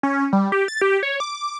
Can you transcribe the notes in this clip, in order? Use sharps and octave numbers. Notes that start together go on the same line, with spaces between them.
C#4
G3
G4
A6
G4
C#5
D6